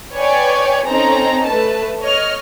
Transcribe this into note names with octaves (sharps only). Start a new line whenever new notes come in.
B4 C#5 D5 G5 G#5
C4 C#4 D#4 A4 A#5
A3 B4 A5
C#5 D#5 F6